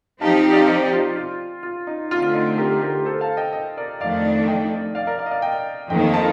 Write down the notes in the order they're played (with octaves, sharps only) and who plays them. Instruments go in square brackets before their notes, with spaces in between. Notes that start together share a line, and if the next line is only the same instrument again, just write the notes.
[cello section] F3 C4 D#4 G4 [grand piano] F5 A5
[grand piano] D#5 G5
D5 F5
C5 D#5
F4
F4
F4
D#4
[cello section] D3 A3 C4 [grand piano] F4
[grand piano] F4
D#4
G4 A#4
G4 A#4
A4 C5
F5 A5
D#5 G5
D#5 G5
A#4 D5
[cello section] F2 D#3 A3 D4 [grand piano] D5 F5
[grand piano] D#5 G5
D5 F5
A#4 D5
D5 F5
D#5
D5 F5
D#5 G5
[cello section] F2 D#3 A#3 [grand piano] D#5 G5
[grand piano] F5 A5